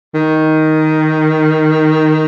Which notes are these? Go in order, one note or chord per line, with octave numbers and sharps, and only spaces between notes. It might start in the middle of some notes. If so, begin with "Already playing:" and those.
D#3